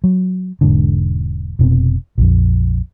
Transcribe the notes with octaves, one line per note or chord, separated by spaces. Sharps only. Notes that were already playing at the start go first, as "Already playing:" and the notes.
F#3
E1 G#2 D3
F1 B2 B3 C4
A#1 F2